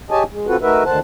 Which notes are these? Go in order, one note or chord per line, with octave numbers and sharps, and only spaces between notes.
G4 G#4 C#5 D#5 G#5 A5
G#3
C4 F4 F#4 A4 B4
A3 D#4 F#4 A#4 B4 E5
D2 D3 D#3 C5 F#5 A5